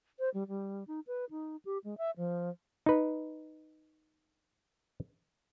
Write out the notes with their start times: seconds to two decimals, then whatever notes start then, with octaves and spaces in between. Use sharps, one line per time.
0.19 C5
0.34 G3
0.48 G3
0.87 D#4
1.07 B4
1.31 D#4
1.65 G4
1.84 G#3
1.98 E5
2.18 F3
2.86 D#4 B4